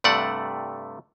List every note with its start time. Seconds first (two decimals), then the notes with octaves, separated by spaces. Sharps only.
0.04 G2 C3 A3 D5 F#5